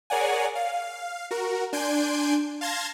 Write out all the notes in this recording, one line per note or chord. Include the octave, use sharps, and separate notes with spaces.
G#4 A#4 C#5 D5 F#5 G#5
F5
F#4 A#4
D4 G#5 C6 G6 D7
F5 A5 C6 G#6 A#6